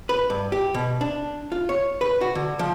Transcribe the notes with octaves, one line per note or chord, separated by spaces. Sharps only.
B4
G2
G4
B2
D4
F4
C#5
B4
F#4
D3
F3